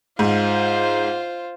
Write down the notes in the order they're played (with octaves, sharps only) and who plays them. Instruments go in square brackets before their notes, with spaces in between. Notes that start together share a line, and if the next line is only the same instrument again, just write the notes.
[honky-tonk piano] G#2 [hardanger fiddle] F4 C5